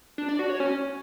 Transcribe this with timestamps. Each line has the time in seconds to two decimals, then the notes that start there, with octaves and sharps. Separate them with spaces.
0.18 D4
0.29 D5
0.39 F#4
0.49 C#5
0.60 C#4